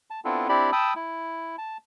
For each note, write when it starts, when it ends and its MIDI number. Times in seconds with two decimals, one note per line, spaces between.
0.10 0.20 81
0.25 0.48 59
0.25 0.48 60
0.25 0.48 62
0.25 0.48 64
0.25 0.48 65
0.25 0.48 69
0.49 0.71 60
0.49 0.71 62
0.49 0.71 64
0.49 0.71 67
0.49 0.71 74
0.49 0.71 83
0.72 0.94 79
0.72 0.94 81
0.72 0.94 83
0.72 0.94 87
0.72 0.94 88
0.96 1.56 64
1.58 1.77 81